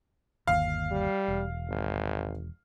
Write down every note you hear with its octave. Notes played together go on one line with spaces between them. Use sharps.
G1 D#2 F5
G3
E1
G#1